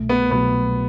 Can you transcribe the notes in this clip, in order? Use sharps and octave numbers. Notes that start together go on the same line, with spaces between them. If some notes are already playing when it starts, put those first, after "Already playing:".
Already playing: C2 B2 A3
B3
C2 B2 F#3 A3 B3